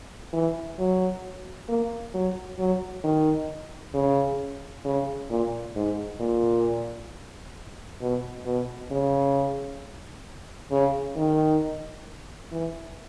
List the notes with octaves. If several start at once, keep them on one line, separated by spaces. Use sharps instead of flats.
E3
F#3
A#3
F#3
F#3
D#3
C#3
C#3
A#2
G#2
A#2
B2
B2
C#3
C#3
D#3
E3